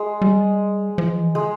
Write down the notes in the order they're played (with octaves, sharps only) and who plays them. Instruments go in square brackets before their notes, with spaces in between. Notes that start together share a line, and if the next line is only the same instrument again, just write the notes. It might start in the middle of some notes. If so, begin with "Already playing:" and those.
Already playing: [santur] G#3
[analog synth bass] G3
F3
E3
[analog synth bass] C#3 [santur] G#3